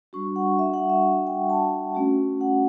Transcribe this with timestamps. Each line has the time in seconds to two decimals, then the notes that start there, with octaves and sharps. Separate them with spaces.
0.13 G3 D4 F#4 C#6
0.36 F#5
0.59 E5
0.74 F#5
0.89 E5
1.27 G5
1.50 A5
1.95 A3 C#4 F#4
2.41 F#5